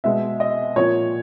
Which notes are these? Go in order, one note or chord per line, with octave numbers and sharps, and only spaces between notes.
B2 G#3 E5
D#5
A#2 F3 A#3 C#5